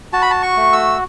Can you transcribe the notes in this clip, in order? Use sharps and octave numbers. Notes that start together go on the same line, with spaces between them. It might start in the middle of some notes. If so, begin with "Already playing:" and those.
F#4 A5
B5
A5
C#6
A3
E6